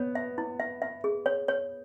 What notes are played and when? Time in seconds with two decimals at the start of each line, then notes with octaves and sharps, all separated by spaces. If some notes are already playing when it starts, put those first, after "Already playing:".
Already playing: B3 C#5
0.15 E5
0.38 E4
0.60 E5
0.82 E5
1.04 G#4
1.26 C#5
1.48 C#5